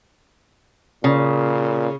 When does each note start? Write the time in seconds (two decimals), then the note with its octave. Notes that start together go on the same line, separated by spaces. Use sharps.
1.04 A#2 C#3